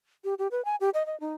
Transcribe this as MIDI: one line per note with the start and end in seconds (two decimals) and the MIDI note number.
0.24 0.34 67
0.39 0.48 67
0.51 0.64 71
0.65 0.76 80
0.81 0.90 67
0.94 1.06 75
1.06 1.18 75
1.20 1.35 63